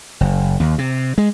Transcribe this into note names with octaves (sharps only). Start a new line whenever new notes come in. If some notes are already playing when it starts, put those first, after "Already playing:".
F#1
D#2
C3
G#3